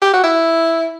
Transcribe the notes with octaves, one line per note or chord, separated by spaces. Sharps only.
G4
F#4
E4